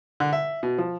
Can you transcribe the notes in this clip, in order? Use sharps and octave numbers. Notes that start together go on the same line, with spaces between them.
D3
E5
B2
F3